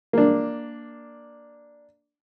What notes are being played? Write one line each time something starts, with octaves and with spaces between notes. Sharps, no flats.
A#3 D4